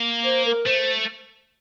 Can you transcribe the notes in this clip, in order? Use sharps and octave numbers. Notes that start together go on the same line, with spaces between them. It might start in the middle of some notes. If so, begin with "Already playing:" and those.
Already playing: A#3
C5
A#4
A3 C5